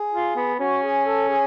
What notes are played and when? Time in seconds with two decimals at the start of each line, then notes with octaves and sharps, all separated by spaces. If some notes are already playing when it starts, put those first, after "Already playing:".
Already playing: G#4
0.13 F4
0.36 B3
0.59 C#4 F#4
0.83 G#4
1.05 A4
1.28 G#4